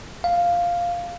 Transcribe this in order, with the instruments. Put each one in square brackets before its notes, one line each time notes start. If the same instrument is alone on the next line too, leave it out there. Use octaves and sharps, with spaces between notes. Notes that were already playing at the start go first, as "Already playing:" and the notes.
[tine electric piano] F5